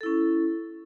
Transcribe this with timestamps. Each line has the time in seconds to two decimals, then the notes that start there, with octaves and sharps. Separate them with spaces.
0.01 A4
0.03 E4
0.06 C#4